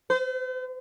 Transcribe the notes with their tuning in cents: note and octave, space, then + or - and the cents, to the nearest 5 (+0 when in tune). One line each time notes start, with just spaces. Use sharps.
C5 -45